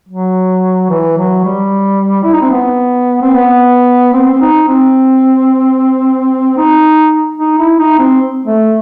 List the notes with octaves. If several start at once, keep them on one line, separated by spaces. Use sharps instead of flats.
F#3
E3
F#3
G3
E4
D#4
C4
B3
C4
B3
C4
C4
D#4
C4
D#4
D#4
E4
D#4
C4
A3